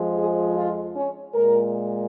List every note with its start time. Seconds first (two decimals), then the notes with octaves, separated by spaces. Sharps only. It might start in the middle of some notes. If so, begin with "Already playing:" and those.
Already playing: F2 F3 G#3
0.17 G#4
0.56 F4
0.96 C#4
1.34 A#2 G#3 A#4